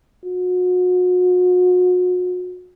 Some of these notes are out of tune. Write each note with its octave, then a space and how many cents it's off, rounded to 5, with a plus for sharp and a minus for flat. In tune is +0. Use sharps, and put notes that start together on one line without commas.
F#4 -35